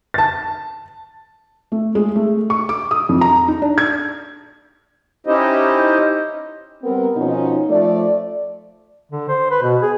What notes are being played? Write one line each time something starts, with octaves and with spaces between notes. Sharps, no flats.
A5 A6
A3
G#3
A3
C#6
D6
D#6
F2
A#5
D#4
D4
G#6
C#4 D#4 E4 G4 C5 D#5
G3 B3 C4 A#4
B2 F3 B3 C#4 D#4
F3 A3 D5
D3
C5
B4
B2
G#4